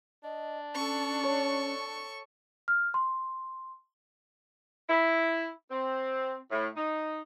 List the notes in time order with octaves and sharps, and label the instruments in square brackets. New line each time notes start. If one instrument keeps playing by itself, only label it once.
[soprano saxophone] D4 [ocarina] D#5
[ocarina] C#4 [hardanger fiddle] A4 C#6
[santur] C#5
[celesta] F6
C6
[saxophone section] E4
C4
A2
D#4